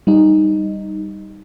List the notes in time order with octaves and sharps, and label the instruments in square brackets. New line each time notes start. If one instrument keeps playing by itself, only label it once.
[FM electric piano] G3 D#4